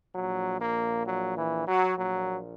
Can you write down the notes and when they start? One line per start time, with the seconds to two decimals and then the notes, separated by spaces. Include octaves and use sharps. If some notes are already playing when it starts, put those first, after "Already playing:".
0.15 A#1 A#2 F#3
0.61 A#3
1.06 F#3
1.37 E3
1.68 F#3
1.98 A#1 A#2 F#3